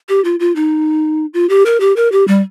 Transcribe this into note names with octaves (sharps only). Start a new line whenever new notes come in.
G4
F4
F4
D#4
F4
G4
A#4
G4
A#4
G4
G3